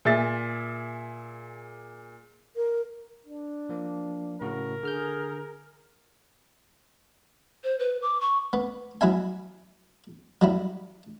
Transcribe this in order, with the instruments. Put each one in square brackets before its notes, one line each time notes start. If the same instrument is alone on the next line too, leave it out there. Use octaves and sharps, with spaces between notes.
[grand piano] A#2 G#4 E5 A6
[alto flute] A#4
[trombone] D4
[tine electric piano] F3 A#3
[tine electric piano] A2 C#3 F#4 [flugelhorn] A#4
[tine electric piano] D3 F6 G6 [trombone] G#4
[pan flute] C5
B4
D6
C#6
[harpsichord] B3
F#3 E4 E5 G#5
F#3 G3 E4